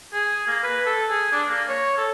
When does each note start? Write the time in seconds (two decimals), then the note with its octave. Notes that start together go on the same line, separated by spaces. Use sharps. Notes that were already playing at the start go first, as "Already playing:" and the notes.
0.13 G#4
0.48 A#3
0.64 B4
0.86 A4
1.10 G#4
1.32 D4
1.48 A#3
1.69 C#5
1.98 A4